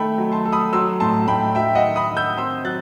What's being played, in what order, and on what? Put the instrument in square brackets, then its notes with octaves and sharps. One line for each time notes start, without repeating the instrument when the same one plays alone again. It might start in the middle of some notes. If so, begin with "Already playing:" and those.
Already playing: [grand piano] D#3 A3 [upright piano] G5 A5 B5
[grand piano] F#3
[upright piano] A5 C6
[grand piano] A4
[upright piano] B5 D#6
[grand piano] F#3 [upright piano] C6 E6
[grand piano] A2 [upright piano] A5 C6
[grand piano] A2 [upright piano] G5 B5
[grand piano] F#3 [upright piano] E5 G5
[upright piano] D#5 F#5
[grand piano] D#3
[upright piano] B5 D#6
[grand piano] D#3
[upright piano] E6 G6
[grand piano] C4 [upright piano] C6 E6
[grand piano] F#3 [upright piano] F#6 A6